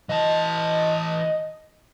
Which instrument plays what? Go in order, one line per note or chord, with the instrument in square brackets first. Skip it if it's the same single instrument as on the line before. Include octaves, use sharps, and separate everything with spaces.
[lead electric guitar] E3 A5 [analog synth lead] D#5